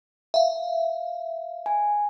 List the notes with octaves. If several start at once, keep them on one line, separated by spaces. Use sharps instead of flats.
E5 F5
G#5